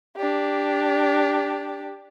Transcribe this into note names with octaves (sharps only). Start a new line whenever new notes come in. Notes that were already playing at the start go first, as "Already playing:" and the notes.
D4 G4